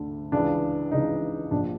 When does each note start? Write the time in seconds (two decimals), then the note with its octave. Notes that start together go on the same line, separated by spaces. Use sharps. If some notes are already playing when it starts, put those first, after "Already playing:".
Already playing: D2 D3
0.32 C#2 C#3 E3 D4
0.92 C#2 C#3 E3 D#4
1.51 A#1 A#2 D4